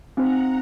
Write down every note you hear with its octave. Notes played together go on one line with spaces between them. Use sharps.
C4 D#4 F#4 C5 F#5 A#5